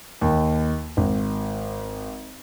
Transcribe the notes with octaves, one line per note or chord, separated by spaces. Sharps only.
D#2
G#1